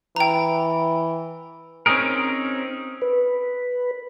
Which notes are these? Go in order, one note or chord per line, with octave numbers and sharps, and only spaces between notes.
E3 G5 A#5
C4 C#4 D#4 G#4 A#4
B4